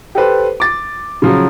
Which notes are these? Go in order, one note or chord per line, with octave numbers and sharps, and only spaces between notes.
G4 A4 B4 C5
D6 A6
C#3 F3 F#3